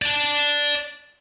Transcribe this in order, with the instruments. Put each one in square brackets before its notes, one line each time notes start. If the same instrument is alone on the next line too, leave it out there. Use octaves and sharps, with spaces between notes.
[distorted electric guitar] D5 A5